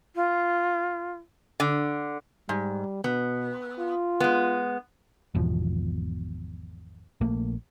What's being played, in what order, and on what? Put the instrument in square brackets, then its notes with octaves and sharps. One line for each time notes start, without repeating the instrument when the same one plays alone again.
[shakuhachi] F4
[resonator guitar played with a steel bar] D3
[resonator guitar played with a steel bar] G#2 [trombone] G3
[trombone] B2 [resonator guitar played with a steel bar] B3
[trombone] F4
[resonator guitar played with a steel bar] G#3 B3
[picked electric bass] G#1 E2 B2 F3
A#1 A3 A#3